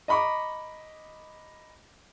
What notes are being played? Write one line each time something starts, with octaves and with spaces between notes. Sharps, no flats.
D#5 A#5 B5 C#6 D6